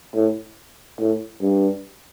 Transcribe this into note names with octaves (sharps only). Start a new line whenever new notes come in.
A2
A2
G2